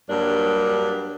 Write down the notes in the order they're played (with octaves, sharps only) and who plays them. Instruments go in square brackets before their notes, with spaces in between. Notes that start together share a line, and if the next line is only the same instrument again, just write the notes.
[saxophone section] G2 F#3 G3 A#3 D4